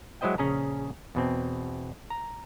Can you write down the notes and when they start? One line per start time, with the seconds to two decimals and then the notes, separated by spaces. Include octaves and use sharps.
0.21 F#3 G#3 E4 C5 D#5 G5
0.38 A#1 C#3 C#4 G#4 A#5
1.15 E2 B2 C4
2.10 A#5